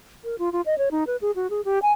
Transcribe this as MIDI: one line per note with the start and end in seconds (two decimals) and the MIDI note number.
0.24 0.38 70
0.39 0.52 65
0.52 0.61 65
0.66 0.78 75
0.78 0.89 73
0.91 1.04 63
1.07 1.16 71
1.21 1.31 68
1.36 1.50 66
1.50 1.61 68
1.65 1.79 67
1.82 1.92 80